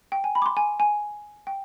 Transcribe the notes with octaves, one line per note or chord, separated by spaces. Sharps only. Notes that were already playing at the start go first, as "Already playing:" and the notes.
G5
G#5
B5
D6
C6
G#5
G#5
G5